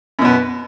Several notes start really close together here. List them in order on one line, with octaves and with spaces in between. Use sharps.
F#2 B2 B3